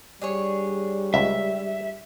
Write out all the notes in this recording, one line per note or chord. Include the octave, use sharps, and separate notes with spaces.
G3 D4 G#4 C#5
C#2 E5